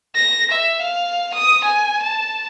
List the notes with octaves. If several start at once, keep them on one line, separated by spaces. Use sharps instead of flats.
A#6
E5
F5
D#6
G#5
A5